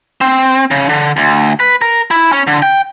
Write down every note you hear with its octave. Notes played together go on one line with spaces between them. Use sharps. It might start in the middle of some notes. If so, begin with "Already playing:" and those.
C4
C#3
D3
D2
B4
A#4
E4
C#4
D3
G5